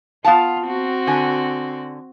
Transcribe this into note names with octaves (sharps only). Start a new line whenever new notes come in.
B3 F4 F5 A5
C4 F#4
D3 G#5